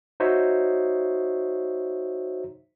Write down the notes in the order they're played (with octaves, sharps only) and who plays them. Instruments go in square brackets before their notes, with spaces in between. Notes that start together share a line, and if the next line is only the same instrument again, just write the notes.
[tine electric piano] D#4 F#4 C5 C#5 E5